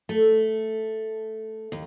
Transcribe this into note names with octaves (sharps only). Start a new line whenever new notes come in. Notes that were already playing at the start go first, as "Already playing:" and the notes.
A3
D#2